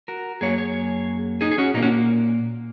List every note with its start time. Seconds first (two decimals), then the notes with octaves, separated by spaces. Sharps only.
0.08 F#4 A#4
0.41 F#2 F#3 A#3 G#4 C#5
0.58 G#4 C#5
1.41 D#4 G#4
1.51 G#4
1.58 C#4 F#4
1.74 A#2 A#3 D#4
1.83 C#4 F#4